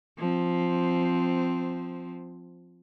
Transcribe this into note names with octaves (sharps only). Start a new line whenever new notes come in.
F3 C4